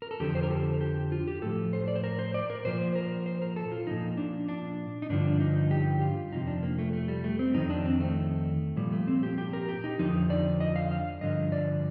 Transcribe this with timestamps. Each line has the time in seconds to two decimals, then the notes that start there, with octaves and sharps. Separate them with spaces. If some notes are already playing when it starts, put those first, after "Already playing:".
0.02 A#4
0.11 A4
0.20 F2 D3 F3 G4
0.35 C5
0.43 A#4
0.50 A4
0.81 G4
1.12 F4
1.28 G4
1.42 A2 F3 A4
1.73 C5
1.88 D5
1.96 C5
2.04 A#4
2.19 C5
2.34 D5
2.50 A#4
2.65 A#2 F3 C5
2.95 A#4
3.26 C5
3.42 A#4
3.56 A4
3.72 F4
3.87 A#2 F3 D#4
4.17 D4
4.49 D4
5.02 D#4
5.10 G2 D3 F3 D4
5.40 D#4
5.71 G4
6.02 F4
6.32 F2 C3 F3 D#4
6.47 D4
6.63 A#3
6.79 A3
6.93 A3
7.08 G3
7.24 A3
7.39 C4
7.54 F2 D#3 D#4
7.70 D4
7.85 C4
8.00 A3
8.77 A#2 F3 G3
8.92 A3
9.07 C4
9.23 G4
9.38 G4
9.53 A#4
9.69 G4
9.84 D#4
9.99 F2 D3 F3 D#4
10.30 D5
10.60 D#5
10.76 F5
10.91 F5
11.21 G2 D3 F3 D#5
11.52 D5